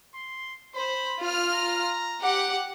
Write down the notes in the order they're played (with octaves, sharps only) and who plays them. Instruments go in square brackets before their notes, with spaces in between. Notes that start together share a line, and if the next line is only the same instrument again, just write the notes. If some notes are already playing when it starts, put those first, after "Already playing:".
[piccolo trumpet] C6
[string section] C5 [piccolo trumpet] B5
[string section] F4 F6
[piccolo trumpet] A#5
[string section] G4 F#5